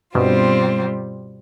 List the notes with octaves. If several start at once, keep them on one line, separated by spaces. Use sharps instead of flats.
G2 B2 G3 C4 F4